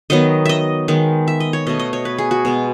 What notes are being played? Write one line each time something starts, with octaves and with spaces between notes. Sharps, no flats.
D#3 F#3 B3 D#5
D#5 E5
D#3 G#3 B3
E5
D#5
C#5
B2 A3 D#5
D#5
C#5
B4
G#4
F#4
B2 G#3 B3